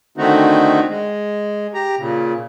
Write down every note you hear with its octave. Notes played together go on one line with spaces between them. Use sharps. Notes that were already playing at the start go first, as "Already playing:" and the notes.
D3 D#3 A3 C4 D#4 F#4
G#3
G4 A#5
A#2 C#3